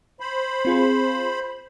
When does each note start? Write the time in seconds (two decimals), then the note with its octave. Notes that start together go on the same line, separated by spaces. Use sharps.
0.20 C5 B5
0.65 C4 F4 G#4